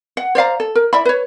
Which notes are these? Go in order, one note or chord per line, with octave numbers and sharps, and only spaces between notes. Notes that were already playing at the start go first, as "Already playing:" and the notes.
F#5
C5 D5 F5 A#5
A4
A#4
E4 D5 E5 B5
B4 C#5